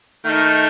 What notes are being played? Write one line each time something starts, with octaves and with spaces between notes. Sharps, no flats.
D#3 A3 D#4 A#4